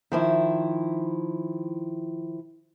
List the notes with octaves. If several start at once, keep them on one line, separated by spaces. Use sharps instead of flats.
D#3 F3 E4